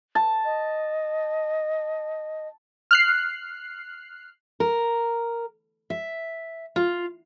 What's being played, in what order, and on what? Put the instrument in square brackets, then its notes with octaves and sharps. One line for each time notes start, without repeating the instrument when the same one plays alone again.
[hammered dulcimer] A5
[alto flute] D#5
[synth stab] F6 F#6 C7
[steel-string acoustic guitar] A#4
E5
F4